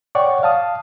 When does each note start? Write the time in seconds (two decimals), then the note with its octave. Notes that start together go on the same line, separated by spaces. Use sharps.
0.15 C#5 D5 F#5 G5 C#6
0.43 F5 A5 D#6